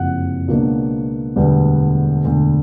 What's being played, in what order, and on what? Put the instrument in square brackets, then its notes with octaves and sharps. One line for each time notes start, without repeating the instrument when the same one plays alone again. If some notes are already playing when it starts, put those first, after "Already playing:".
Already playing: [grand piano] F#1 F2 C3 F#5
C#2 B2 F#3 A#3 D4
E1 D2 D3 G3 B3
E1 D2 D3